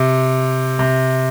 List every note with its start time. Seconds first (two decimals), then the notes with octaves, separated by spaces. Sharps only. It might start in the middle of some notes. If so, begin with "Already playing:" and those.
Already playing: C3
0.79 C3